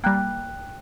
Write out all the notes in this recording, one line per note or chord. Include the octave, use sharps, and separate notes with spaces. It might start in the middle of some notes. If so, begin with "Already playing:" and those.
G3 A#3 G5 F#6